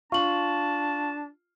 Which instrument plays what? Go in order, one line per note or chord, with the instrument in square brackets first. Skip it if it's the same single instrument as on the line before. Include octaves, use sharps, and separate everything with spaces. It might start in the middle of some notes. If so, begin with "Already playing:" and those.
[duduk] D4 [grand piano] F4 [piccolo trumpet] A5 [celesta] C#6 F#7